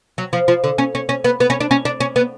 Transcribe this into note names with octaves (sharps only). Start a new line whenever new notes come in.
F#3
F3
F3
D3
C#4
C#4
C#4
B3
B3
C#4
D4
C#4
D4
C#4
B3